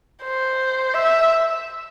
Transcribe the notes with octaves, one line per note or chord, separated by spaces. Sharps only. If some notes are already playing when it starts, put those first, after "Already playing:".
C5
E5